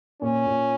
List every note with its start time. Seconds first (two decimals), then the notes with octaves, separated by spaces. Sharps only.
0.22 A#2 C#4
0.46 A#2